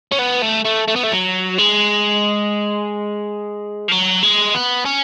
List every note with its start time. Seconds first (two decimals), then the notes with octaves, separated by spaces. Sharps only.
0.12 C#4
0.19 B3
0.42 A3
0.65 A3
0.88 A3
0.96 B3
1.04 A3
1.12 F#3
1.58 G#3
3.88 F3
3.92 F#3
4.23 G#3
4.55 B3
4.86 C#4